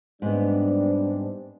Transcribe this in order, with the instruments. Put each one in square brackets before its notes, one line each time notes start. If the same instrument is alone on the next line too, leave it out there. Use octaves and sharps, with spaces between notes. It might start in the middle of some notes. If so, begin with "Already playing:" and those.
[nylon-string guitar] G#2 B3 [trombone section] G3 C4 D4